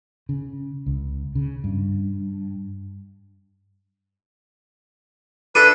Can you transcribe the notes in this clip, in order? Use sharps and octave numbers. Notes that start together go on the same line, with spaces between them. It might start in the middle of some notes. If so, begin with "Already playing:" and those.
C#3
C#2
C#3
G2
D4 A4 B4 E5 D#7